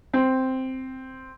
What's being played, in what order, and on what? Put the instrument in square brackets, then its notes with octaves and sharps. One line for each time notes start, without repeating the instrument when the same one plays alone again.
[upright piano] C4